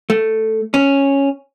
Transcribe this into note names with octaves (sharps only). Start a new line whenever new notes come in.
A3
C#4